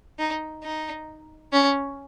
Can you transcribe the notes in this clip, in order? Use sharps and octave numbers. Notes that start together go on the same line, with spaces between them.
D#4
D#4
C#4